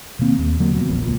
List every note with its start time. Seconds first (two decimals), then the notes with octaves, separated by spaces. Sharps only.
0.19 B2 D#3 A#3 C4
0.39 D#2
0.60 D3 F#3 A#3
0.74 F2 B2
0.90 E1 A#1
1.02 C#2 A#2